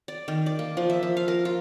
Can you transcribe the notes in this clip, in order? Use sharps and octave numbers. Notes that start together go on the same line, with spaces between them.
D5
D#3
D5
A#3
F3
E5
F3
F5
A#4
F4